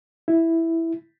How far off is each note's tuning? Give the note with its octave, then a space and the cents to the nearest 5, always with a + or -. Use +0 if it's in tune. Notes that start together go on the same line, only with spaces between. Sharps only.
E4 +0